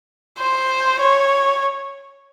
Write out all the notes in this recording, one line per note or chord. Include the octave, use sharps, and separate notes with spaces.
C5
C#5